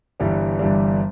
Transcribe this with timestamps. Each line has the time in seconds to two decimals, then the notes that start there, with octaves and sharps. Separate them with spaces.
0.20 G1 G2 E3 G3 D4
0.59 G1 G2 E3 G3 D4